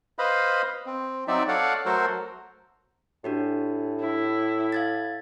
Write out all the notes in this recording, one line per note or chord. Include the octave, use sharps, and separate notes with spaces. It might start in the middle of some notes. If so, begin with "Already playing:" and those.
B4 C5 D#5 F5 B5
C4
F#3 C4 D#4 D5 E5
A4 C#5 D5 F5 F#5
F#3 A3 F#4 A4 A#4 C5
A2 D4 F#4 G4
E4
F5 G#6 A6